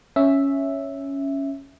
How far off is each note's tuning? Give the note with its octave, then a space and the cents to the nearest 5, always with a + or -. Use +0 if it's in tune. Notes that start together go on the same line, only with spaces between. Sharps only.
C#4 +0 E5 +0